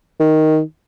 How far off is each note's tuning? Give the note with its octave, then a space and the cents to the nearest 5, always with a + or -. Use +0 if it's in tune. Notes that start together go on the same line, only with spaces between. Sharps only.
D#3 +5